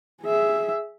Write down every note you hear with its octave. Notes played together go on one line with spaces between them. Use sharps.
G#4 E5